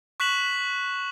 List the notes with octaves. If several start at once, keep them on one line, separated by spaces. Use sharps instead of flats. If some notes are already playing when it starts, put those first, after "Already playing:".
C#6 F#6 B6 E7 F#7